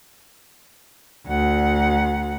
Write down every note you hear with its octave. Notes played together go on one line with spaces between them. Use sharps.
D2 F#5